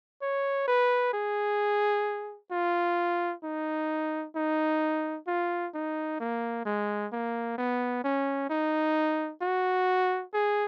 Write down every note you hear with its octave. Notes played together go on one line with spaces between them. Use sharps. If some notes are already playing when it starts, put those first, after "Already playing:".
C#5
B4
G#4
F4
D#4
D#4
F4
D#4
A#3
G#3
A#3
B3
C#4
D#4
F#4
G#4